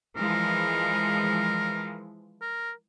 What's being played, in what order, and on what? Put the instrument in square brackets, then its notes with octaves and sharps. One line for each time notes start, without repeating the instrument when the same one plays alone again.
[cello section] E3 F3 G#3 [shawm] A#4
[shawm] A#4